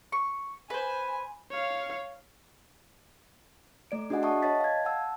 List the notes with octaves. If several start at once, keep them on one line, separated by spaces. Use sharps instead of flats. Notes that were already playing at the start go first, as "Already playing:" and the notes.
C#6
B4 C5 G#5
C#5 F5
A3 D5 D7
D4 F#4 G#4 D#5 F#5 G#5
E5 F#5 A5 C#6 D#6
C#5 D#5 A5 A6 B6
F5 G#6
F#5 A5 E6